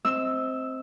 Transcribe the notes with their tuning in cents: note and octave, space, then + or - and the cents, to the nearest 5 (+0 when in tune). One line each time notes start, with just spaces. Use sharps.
C4 +0 D#5 +35 E6 +0